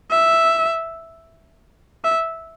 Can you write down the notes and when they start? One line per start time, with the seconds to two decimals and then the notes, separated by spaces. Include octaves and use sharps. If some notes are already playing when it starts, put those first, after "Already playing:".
0.11 E5
2.04 E5